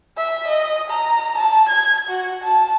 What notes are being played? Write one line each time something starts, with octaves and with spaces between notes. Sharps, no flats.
E5
D#5
A#5
A5
G#6
F#4
A5